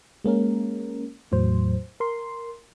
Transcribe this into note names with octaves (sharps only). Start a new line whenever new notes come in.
G#3 A#3 C#4 A#4
E2 A2 F#3 C5
A#4 C6